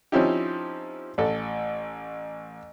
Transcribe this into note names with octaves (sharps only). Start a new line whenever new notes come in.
F3 C4 C#4 D#4 E4 G4
A1 A4